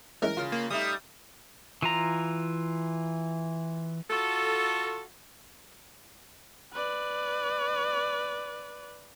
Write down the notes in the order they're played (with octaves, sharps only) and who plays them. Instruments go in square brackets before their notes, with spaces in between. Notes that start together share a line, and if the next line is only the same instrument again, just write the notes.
[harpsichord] E3 G#3 C#4 [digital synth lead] A#4
[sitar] C#3 F4
[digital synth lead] A#3
[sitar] G3 A3 D#4 [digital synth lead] D#6
[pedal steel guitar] E3 F4 A#5
[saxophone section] F4 F#4 A4
[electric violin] B4 D5